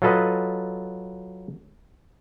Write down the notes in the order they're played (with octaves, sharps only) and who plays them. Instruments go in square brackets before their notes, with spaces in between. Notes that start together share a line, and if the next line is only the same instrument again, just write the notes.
[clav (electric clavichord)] F#3 F4 A4 B4 D#5